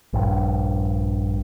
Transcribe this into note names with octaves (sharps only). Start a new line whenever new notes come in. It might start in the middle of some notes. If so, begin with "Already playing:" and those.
A#1 G2